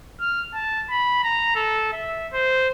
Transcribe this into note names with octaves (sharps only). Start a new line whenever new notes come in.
F6
A5
B5
A#5
A4
E5
C5